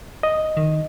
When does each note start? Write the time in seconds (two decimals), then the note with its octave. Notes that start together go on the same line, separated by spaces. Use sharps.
0.23 D#5
0.57 D#3